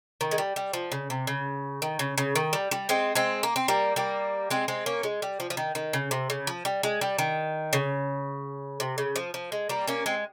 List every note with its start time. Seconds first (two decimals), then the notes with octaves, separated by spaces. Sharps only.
0.21 D#3
0.31 G#3
0.38 G3
0.56 G3
0.73 F3
0.92 C#3
1.10 C3
1.27 C#3
1.82 D#3
1.99 C#3
2.18 C#3
2.36 D#3
2.53 G3
2.71 G3
2.89 G#3 C4
3.15 G#3 C4
3.43 A#3
3.56 C4
3.68 G3 A#3
3.96 G3 A#3
4.50 G#3 C4
4.68 G#3 C4
4.86 A#3 C#4
5.03 G#3
5.22 G3
5.40 F3
5.50 F3
5.57 D#3
5.75 D#3
5.93 C#3
6.11 C3
6.30 C#3
6.47 F3
6.65 G3
6.83 G#3
7.01 G3
7.18 D#3
7.73 C#3
8.80 C3
8.98 C#3
9.16 F3
9.34 F3
9.52 G#3
9.69 G3 A#3
9.87 A#3 C#4
10.06 G#3 C4